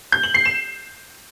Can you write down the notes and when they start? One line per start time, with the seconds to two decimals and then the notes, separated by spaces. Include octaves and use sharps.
0.12 G6
0.23 F#7
0.34 C7
0.45 E7